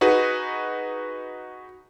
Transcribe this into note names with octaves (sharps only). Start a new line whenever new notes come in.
D#4 F#4 G#4 B4